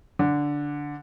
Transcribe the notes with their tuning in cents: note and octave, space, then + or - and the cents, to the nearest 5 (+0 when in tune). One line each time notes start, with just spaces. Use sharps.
D3 -5